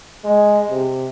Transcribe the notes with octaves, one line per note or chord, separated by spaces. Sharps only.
G#3
C3